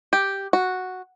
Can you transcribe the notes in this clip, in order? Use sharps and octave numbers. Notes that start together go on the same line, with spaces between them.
G4
F#4